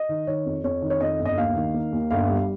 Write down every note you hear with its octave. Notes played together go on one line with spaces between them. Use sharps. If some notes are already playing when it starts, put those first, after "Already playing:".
Already playing: D#5
D#3
D#3 C#5
F2
F2 C#5
D#3
C#5
F2 D#5
G1
D#5
D#2 F5
D#3
A#3
D#2
G1 F5
G3